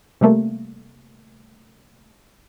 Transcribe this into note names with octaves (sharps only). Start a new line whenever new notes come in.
C3 G3 A3 A#3